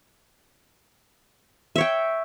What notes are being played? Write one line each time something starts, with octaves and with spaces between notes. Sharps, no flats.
C#5 E5 G5